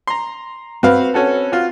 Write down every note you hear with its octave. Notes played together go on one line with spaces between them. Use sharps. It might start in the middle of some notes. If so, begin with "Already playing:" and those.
A#5 C6
C4 F#4 B4 F5
C#4 F#4 A4
F4 F#4